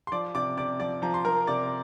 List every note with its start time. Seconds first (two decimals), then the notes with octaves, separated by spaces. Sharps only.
0.07 C6
0.12 F3 D5 D6
0.35 C3 D5 D6
0.57 C3 D5 D6
0.80 F3 D5 D6
1.02 F3 A#5
1.14 C6
1.25 F3 A#4 A#5
1.47 C3 D5 D6